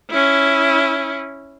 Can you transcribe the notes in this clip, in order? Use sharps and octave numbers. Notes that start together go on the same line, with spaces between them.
C#4 E4